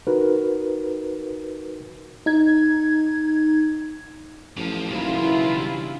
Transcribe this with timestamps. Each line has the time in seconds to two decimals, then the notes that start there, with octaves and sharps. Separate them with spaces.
0.07 D#4 F#4 A#4 B4
2.26 D#4 G#6
4.57 A1 F#2 F3
4.91 D#1 B1 C#3 F#3 E4 F4
5.22 E3
5.57 G2